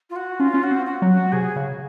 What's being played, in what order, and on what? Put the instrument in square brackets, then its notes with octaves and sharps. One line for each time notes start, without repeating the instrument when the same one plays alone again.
[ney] F4
F#4
[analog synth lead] C#4 [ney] F4
[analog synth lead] C#4
[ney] F#4
[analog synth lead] C4
[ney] F#4
[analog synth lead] F#3
[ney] F#4
[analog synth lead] C3 [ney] G#4
[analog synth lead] C#3